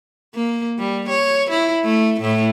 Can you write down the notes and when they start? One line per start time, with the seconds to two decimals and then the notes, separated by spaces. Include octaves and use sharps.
0.35 A#3
0.79 G3
1.09 C#5
1.51 E4
1.85 A3
2.21 A2